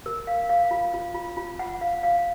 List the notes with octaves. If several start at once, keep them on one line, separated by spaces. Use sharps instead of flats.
A#4
F5
F5
F4
F4
F4
F4
F#5
F5
F5